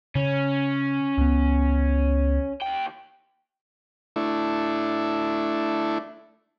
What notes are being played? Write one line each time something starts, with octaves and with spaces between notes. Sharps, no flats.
C#3 C#4
C#2 B3
D#2 G5
A3 D4 E4